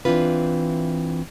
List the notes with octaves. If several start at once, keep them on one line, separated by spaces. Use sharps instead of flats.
E3 C4 D4 F4 B4